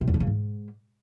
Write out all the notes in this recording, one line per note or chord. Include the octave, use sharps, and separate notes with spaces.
C3
E2
D3
C#3
G#2